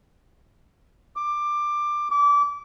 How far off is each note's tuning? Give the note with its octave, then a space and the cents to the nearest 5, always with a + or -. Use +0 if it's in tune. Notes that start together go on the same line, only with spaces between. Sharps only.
D6 +15
D6 -25